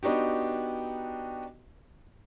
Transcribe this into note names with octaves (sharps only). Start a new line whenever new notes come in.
B3 D4 D#4 F#4 G4